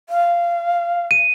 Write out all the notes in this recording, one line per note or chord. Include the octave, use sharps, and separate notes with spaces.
F5
D#7